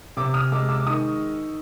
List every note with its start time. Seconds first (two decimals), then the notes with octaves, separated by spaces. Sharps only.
0.17 C3 D6 E6
0.34 D#6 F6
0.52 G#3 D6 E6
0.69 D6 E6
0.79 D6
0.86 D#3 C#6 D#6